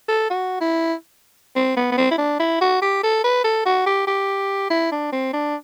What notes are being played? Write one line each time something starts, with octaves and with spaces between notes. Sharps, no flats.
A4
F#4
E4
C4
B3
B3
C4
E4
D4
E4
F#4
G4
A4
B4
A4
F#4
G4
G4
E4
D4
C4
D4